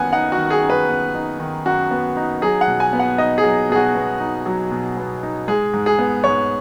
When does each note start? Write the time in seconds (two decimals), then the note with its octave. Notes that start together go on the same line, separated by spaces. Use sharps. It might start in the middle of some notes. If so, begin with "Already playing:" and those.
Already playing: F#2 D#3 B3 F#5 G#5
0.13 D#4 F#5
0.32 F#4
0.38 D#3
0.50 G#4
0.64 F#2
0.70 B4
0.89 B3
1.14 D#4
1.40 D#3
1.65 F#2 F#4
1.91 B3
2.17 D#4
2.42 F#3 G#4
2.61 F#5
2.68 B2
2.80 G#5
2.93 B3
2.99 F#5
3.18 D#4 D#5
3.38 G#4
3.44 F#3
3.69 B2 G#4
3.76 F#4
3.95 B3
4.20 D#4
4.46 F#3
4.71 B2
4.97 B3
5.23 D#4
5.48 G#3 G#4
5.74 G#2
5.86 G#4
5.99 B3
6.24 G#2 C#5